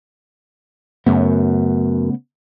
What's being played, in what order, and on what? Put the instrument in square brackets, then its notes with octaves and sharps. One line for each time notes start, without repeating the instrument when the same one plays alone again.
[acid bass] F#2 [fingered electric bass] C#3 A3 B3